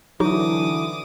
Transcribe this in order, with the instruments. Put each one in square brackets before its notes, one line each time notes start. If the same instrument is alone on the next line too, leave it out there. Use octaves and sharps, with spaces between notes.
[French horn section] D3 E3 [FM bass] F#3 [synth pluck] D#4 F#4 [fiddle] D6 D#6